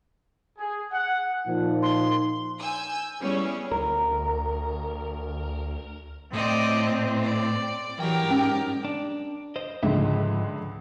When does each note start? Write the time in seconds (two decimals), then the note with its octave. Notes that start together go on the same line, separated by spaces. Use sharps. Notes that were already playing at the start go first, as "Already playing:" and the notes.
0.59 G#4
0.92 F#5
1.47 A#2 F3 D#4
1.82 C6
2.60 G#5 E6 G6
3.19 G3 B3 C#4 E4 G#4 C#5
3.72 D2 A#4
6.33 A2 C4 D5 D#5
7.24 D5
8.00 E3 F#3 G4 A#4 G5
8.31 G#2 C#4
8.85 D4
9.56 C5 D#5
9.83 C#2 G#2 D3 F3 G#3 E5